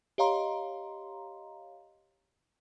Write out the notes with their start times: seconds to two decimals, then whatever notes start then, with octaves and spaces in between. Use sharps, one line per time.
0.18 G4 C#5 D#5 F5 A#5 C6